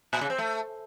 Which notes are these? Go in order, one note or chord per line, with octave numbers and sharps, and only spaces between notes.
A#2
C#3
C4
A3